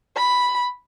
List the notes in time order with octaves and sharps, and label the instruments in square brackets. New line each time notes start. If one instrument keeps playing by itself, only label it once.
[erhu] B5